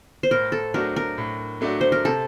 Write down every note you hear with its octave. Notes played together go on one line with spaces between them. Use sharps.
C5
A2 A#4
A4
F#3 A3 D4 F#4 A#4
A#4
A2
F#3 A3 D4 F#4
C5
A#4
C3 A4